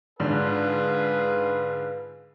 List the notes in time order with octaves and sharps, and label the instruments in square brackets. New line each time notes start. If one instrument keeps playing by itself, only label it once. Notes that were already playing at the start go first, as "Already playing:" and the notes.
[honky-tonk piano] G#2 D3 [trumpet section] F4 G#4 B4